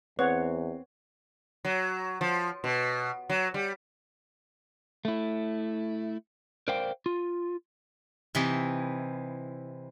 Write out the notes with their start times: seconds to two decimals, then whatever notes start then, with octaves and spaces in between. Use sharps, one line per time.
0.19 E2 C4 B4 C#5 F#5
1.65 F#3
2.21 F3
2.64 B2
3.30 F#3
3.54 G3
5.05 A3 E4
6.68 A#4 C5 D5 F5 G5
7.06 F4
8.35 C3 E3 D#4 E4